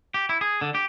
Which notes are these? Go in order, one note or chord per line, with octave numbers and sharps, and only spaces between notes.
G4
E4
G#4
D3
G4